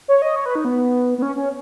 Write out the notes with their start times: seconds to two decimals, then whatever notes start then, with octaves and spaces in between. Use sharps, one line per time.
0.08 C#5
0.22 D#5
0.36 C#5
0.46 B4
0.55 D#4
0.65 B3
1.18 B3
1.22 C#4
1.36 C#4